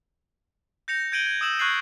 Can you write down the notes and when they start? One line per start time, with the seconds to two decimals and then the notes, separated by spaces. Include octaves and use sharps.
0.88 G6 A#6 C#7 F7
1.12 G6 G#6 D7 D#7 F#7 G7
1.27 G#6
1.41 D#6 E6 E7 F#7
1.59 C#6 F#6 G#6 A6 C7 F#7